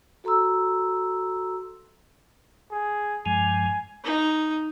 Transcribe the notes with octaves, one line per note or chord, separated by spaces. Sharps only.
F#4 A4 A#5 C6 E6
G#4
G2 F3 G#3 G#5
D#4